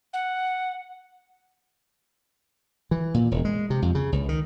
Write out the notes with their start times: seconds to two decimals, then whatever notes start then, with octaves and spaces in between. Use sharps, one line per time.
0.13 F#5
2.91 E3
3.14 A#2
3.31 E1
3.45 G#3
3.70 C3
3.82 F2
3.95 C#3
4.12 C#2
4.29 D#3